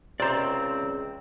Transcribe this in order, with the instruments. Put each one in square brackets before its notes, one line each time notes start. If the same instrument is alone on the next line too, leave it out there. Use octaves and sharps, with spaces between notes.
[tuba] C#2 [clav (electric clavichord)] C3 C5 [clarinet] C4 [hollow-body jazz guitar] D5 A#5